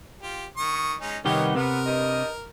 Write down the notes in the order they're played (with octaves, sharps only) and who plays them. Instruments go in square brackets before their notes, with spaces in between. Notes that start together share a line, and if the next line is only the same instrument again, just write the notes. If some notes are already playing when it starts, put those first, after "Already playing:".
[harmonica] F4 G4
D#3 C#6 D#6
G#3 C#4 D#4
[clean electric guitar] C2 D#3 G4 [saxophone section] B3 D#4 [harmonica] A#4 C#5 D#5
[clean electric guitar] C3 [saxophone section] B3 [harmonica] A#4
[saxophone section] G2 D#5